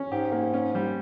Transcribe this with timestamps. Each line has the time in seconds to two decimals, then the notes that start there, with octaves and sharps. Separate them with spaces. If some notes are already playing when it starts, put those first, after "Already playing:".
Already playing: C#4
0.12 G#2 G4
0.32 A#3
0.54 C#4
0.75 G3